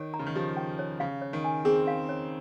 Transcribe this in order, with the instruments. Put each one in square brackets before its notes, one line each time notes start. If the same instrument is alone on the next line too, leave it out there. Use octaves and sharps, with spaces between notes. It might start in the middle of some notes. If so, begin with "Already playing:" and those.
Already playing: [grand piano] D#3 [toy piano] C#5
[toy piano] A#5
[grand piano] C#3
D#3
[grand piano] F3 [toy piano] G4
[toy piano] G5
C#5
[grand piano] C#3 [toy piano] F5
[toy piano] C#5
[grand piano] D#3
[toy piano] G#5
[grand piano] C4 [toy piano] G#4
[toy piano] F5
C#5